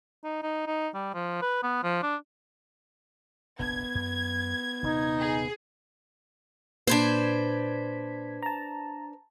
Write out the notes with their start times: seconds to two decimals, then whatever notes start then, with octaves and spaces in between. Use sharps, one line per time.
0.24 D#4
0.43 D#4
0.67 D#4
0.94 G3
1.14 F3
1.42 B4
1.64 B3
1.84 F3
2.03 D4
3.59 F1 A#1 B3 D4 G#6
3.95 F#2
4.83 D#1 C3 D#4
5.20 G#4
6.87 A#2 D4 B4 C5 G#6 B6
8.43 A5 A#5